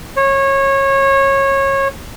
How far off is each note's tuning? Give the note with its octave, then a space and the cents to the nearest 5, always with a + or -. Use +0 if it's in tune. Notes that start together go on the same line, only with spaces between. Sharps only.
C#5 -20